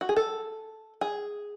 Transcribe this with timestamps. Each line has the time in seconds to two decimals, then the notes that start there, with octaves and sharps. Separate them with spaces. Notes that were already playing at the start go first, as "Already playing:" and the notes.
0.01 F#4
0.09 G#4
0.16 A4
1.01 G#4